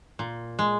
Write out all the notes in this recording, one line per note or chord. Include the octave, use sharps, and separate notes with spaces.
A#2
G#3